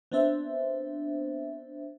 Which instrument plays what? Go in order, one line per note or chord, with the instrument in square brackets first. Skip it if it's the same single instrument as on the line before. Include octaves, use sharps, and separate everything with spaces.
[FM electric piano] B3 C4 D4 C5 E5